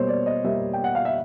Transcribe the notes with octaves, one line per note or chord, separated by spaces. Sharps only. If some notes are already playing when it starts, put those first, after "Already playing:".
Already playing: B2 G3 A#3 C5 C#5
D5
D#5
B2 G3 A#3 E5
G5
F#5
F5
E5